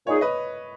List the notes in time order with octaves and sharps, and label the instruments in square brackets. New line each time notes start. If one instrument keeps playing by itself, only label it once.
[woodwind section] A#2 G#3 D#4 G#4 [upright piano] C#5
[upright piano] B4 D#5